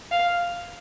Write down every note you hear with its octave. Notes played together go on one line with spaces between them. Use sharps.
F5